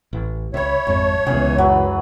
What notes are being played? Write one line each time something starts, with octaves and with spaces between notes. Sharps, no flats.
A1
C#2 C#5 E5 B5
G#1 F2 G#2 A5 C#6
C#2 C#3 E3 B3 G#4
F#2 F#3 B4